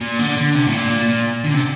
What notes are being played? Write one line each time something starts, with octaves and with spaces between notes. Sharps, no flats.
A#2
D3
D3
C3
A2
A#2
A#2
A#2
D3
C3